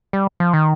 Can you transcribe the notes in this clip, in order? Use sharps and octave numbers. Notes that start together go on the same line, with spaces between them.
G3
F3
D#3